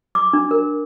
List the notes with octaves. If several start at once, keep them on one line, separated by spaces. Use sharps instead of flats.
D6
D4
A#4